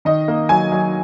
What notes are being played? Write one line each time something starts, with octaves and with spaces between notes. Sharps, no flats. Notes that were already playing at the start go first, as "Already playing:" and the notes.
D#3 D#5
A#3
F#3 G#5
F#3